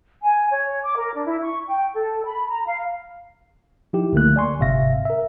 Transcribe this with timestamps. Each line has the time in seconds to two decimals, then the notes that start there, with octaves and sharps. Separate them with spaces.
0.23 G#5
0.51 C#5
0.82 D6
0.97 A#4
1.13 D4
1.26 E4
1.42 C#6
1.68 G5
1.94 A4
2.26 B5
2.49 A#5
2.65 F5
3.93 F3 D#4 E4 G4
4.13 C#2 D3 A3 A#3 F#6
4.36 D5 G#5 C6 C#6
4.59 G1 G#2 C3 E5 F5 A#6
5.05 A#4 E5